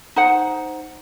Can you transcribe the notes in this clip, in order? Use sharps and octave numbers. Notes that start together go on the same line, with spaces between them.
D#4 C5 F#5